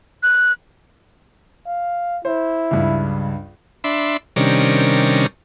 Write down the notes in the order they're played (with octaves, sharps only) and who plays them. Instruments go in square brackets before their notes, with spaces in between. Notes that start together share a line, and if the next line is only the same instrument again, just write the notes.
[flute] F#6
[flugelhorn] F5
[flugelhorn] E4 [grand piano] C5
[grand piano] C#2 G2
[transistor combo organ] D4 E5 B5 C6
C3 D#3 G3 C#4 D4 A#4